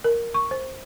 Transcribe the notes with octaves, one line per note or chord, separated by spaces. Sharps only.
A#4
C#6
C5